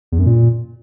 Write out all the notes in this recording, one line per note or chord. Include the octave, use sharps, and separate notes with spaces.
E2
F#2
A#2